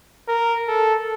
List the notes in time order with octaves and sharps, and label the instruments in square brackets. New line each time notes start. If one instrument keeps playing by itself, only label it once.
[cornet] A#4
A4